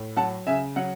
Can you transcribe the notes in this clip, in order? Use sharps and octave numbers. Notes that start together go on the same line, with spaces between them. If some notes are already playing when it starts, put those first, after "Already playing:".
Already playing: A2
F#3 F#5 A5
C#3 E5 G#5
F#3 F#5